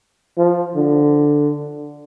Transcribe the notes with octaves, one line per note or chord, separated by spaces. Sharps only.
F3
D3